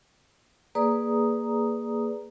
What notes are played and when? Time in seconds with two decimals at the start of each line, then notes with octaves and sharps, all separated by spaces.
0.75 A#3 G#4 B4 D5 A#5 D#6